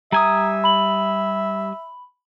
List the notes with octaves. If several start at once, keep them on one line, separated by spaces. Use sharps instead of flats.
G3 E5 G#5 A#5 D#6
B5 F#7